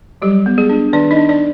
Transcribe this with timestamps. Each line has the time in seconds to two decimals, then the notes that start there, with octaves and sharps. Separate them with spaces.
0.22 F#3 G3 G4
0.46 B3
0.58 G#3 G#4
0.70 D4
0.93 D#3 D4 D5
1.11 D#4 D#5
1.17 D4
1.29 D4 D5